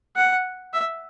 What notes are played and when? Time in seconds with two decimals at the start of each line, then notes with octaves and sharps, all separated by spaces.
0.16 F#5
0.74 E5